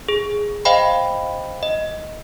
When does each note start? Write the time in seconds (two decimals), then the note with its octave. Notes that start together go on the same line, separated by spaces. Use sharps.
0.08 G#4
0.65 C5 D#5 F5 G5 B5
1.63 D#5